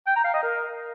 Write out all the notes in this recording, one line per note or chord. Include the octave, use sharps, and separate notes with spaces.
G5
A#5
F5
D#5
A#4